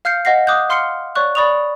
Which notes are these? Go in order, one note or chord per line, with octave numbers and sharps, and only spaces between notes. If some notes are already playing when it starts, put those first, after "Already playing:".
F5 F6 G6 C7 C#7
D#5 F#5 A#6 C7
D6 D#6 F#6 G6
F5 C6 F6 C7 C#7 G7
C#5 D5 C#6 F#6
D5 B5 C#6 D#6 F7